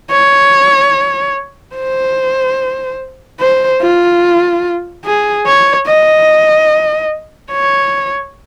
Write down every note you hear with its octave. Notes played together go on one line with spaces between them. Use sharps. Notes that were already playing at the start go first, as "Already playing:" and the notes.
C#5
C5
C5
F4
G#4
C#5
D#5
C#5